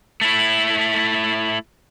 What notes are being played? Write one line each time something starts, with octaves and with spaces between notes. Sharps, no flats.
A3 E4